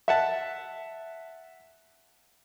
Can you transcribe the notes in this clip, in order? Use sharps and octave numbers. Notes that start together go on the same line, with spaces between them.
E5 F#5 A5